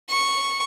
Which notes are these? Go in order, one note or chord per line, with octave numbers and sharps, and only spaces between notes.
C#6